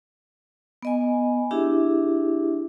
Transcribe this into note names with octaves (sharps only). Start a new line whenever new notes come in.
B3 D#5 G#5
D4 E4 G4 G#4 E5